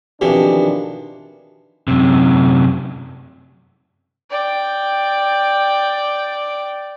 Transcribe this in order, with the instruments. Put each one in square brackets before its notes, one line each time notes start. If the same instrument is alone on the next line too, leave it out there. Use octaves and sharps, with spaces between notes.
[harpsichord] F2 B2 E3 [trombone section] D#3 D4 [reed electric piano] G4
[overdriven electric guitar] F#2 C3
[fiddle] D5 G5